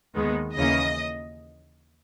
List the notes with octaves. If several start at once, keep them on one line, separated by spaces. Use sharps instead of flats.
D#2 D#3 G#3 B3
D#2 C#3 E3 A#3 C#4 D#5